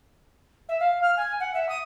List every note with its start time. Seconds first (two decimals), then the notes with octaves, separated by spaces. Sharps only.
0.69 E5
0.80 F5
1.02 F6
1.17 G#5
1.40 F#5
1.54 E5
1.69 D#6